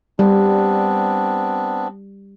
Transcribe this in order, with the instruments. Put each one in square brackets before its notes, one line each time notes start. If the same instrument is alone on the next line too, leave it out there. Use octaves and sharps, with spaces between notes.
[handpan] G3 [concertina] B3 C4 D4